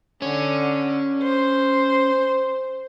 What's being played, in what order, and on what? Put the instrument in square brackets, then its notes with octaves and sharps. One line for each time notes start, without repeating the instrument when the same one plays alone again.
[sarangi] D3 [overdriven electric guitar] C#4
[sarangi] C5